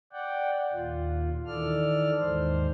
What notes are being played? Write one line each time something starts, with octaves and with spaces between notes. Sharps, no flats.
D5 F#5 G5
D#2 A#2 F4
D#3 E3 A4 D5 F6
D#2 G#2 D#3 C5